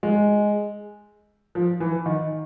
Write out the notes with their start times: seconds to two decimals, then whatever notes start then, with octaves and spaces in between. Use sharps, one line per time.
0.03 G#3
1.55 F3
1.80 E3
2.06 D#3